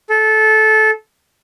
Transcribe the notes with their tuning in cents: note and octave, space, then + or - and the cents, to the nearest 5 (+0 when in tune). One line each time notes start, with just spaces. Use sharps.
A4 -20